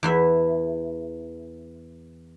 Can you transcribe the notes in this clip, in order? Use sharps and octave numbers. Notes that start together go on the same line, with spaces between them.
E2 E3 E5